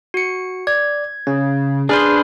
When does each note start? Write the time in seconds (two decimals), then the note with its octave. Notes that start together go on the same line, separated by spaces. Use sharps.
0.14 F#4 C#7
0.67 D5 G#6
1.27 C#3 C#4
1.89 D4 G#4 B4 C5 G#5 F6